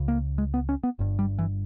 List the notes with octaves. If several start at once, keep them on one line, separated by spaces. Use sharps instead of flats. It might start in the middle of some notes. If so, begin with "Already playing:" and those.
Already playing: C#2 C#3
A#3
G#3
B3
C#4
B3
G1 G2
G3
E3